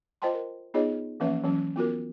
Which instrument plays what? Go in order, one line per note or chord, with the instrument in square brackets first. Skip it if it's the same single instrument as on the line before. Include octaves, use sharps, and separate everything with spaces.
[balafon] F4 C5 D#5 G5 A5 C6
A#4
B3 D#4 F4 G#4 C#5 D#5
E3 F3 A#3 C#4 B4 E5
E3 F#3 C#4
B3 F4 F#4 A#4